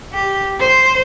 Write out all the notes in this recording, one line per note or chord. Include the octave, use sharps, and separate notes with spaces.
G4
C5